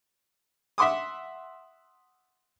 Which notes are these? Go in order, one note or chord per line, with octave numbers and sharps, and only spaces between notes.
E5 F#5 C6 D6 D#6